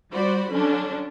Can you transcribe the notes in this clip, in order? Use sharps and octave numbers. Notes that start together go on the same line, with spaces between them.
G3 F#4 C5 D5 B5
D3 F#3 C#4 D4